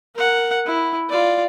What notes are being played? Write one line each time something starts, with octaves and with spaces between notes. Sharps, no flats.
A#4 F#5
E4
F4 D5